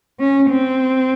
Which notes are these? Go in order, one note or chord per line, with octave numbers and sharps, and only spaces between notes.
C#4
C4